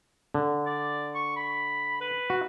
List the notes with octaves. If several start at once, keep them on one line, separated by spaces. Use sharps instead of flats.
D3
D5
C#6
B5
B4
F#4